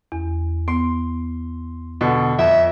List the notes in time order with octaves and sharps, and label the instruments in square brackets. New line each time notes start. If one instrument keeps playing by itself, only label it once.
[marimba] E2
[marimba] B3 [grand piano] C6
[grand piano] B2 D3
[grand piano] F2 [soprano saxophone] E5